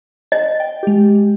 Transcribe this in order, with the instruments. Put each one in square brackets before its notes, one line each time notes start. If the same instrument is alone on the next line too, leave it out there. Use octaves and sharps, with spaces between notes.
[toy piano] D#5
[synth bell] G5
G#3 G4